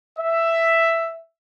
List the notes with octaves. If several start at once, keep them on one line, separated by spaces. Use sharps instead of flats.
E5